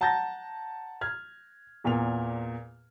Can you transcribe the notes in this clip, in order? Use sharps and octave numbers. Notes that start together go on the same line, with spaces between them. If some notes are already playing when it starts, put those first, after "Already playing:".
F#5 A5 A#5 G6 A6 A#6
F6 G#6
E2 A#2 A#4 F7